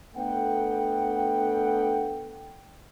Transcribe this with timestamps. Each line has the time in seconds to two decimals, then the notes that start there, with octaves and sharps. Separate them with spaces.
0.16 A3 B3 D4 A4 F#5 G5